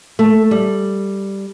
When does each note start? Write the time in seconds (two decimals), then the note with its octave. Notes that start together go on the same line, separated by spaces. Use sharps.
0.19 A3
0.51 G3